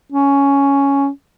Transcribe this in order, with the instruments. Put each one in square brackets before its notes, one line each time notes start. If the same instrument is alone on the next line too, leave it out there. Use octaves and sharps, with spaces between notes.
[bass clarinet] C#4